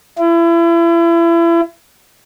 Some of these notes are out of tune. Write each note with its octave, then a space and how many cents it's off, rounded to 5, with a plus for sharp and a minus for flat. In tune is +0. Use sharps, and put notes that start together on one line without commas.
E4 +35